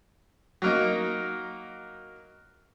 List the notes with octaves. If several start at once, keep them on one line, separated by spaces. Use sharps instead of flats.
F#3 A#3 D#4